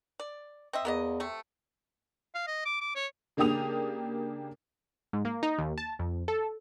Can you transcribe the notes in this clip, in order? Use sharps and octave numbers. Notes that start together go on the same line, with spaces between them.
D5
C4 D#5 E5
E2 A#3 B3 D#5
C3 A3
F5
D#5
D6
D6
C#5
C#3 A#3 D4 G4 D#6 F7
G#2
A#3
D#4
D#2
A5
F2
A4